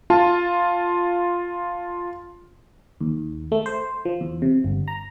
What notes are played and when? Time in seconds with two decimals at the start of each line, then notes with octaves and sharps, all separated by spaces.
0.10 F4 A5
3.01 D#2
3.52 A3
3.66 C5
4.05 F3
4.21 E2
4.42 C3
4.64 G1
4.88 A#5